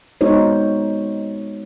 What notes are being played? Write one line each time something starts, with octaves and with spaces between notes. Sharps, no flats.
G#3 B3 D#4 F#4 C5 C#5